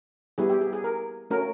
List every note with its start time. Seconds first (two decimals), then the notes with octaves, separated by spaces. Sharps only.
0.38 G3 B3 E4 G4 G#4
0.50 G4
0.61 G#4
0.73 G#4
0.84 A#4
1.30 A3 C#4 F#4 A#4